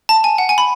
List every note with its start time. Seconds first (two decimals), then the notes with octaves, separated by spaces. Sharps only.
0.09 A5
0.24 G#5
0.38 F#5
0.49 G#5
0.58 B5